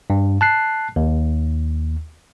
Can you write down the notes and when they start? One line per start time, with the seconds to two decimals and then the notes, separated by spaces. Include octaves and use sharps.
0.10 G2
0.41 A5 F#6 C7
0.96 D#2